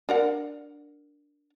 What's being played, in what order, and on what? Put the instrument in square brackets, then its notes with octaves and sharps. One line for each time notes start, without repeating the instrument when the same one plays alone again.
[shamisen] D4 A#4 F#5